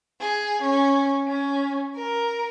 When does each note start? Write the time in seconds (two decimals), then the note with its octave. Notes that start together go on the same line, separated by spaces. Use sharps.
0.21 G#4
0.62 C#4
1.28 C#4
1.95 A#4